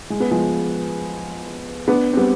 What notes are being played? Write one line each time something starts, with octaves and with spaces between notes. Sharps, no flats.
G#3
B3
F3 G#3
B3 D4
C4
G3 B3